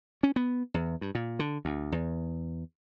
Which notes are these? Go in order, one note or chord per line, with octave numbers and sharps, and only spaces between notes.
C#4
B3
E2
G2
A#2
D3
D2
E2